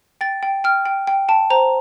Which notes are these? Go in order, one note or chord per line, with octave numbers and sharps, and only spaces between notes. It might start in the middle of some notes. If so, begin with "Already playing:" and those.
G5 A6
G5
G5 F6
G5
G5
G5 A5
C5 A#5